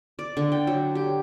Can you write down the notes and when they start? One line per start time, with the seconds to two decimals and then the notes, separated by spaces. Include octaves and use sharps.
0.19 D5
0.37 D3
0.52 G5
0.67 F#3
0.95 G4